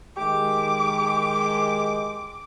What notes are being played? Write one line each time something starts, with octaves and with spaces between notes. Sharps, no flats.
D#3 G#3 G4 D6